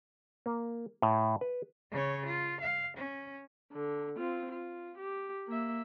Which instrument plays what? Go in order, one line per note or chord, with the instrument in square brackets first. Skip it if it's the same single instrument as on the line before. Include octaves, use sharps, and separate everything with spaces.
[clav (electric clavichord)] A#3
A2
B4
[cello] C#3 C#5
F4
F5
C#4
[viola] D3
C4 F4
F4
G4
A#3 E5